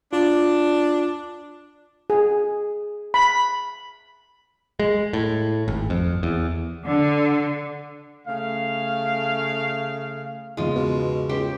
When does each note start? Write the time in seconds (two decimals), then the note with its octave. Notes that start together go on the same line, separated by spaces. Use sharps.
0.13 D4 F4
2.10 G#4
3.14 B5
4.80 G#3
5.13 A2
5.68 G#1
5.90 F2
6.23 E2
6.85 D3
8.27 C#3 A3 F5
10.57 E2 G#2 C#3 G#3 F4
10.76 B2
11.29 C#2 G4 C5 G5